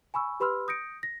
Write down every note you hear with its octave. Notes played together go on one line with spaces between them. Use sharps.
G#5 B5 C#6 E6
G4 B4 B5 C6 E6 F6
D#6 G6 A#6 C#7 D7
A#6